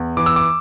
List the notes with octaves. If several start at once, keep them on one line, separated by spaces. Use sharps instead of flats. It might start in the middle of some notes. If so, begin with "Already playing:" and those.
Already playing: E2
E3 D6
E6
D6